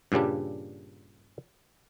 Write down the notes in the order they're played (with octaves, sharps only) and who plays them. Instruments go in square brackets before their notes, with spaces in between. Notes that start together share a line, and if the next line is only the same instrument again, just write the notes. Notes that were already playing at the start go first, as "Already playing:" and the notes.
[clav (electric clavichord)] G2 A#2 C#3 G3 D4